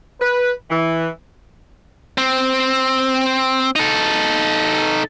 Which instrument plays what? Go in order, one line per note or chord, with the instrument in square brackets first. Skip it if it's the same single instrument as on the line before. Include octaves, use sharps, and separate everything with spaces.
[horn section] B4
E3
[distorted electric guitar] C4
D#4 A4